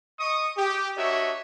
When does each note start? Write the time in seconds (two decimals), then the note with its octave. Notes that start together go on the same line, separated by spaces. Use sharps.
0.19 D#5 C#6 D#6
0.56 G4
0.97 D4 F#4 A#4 C#5 D#5 E5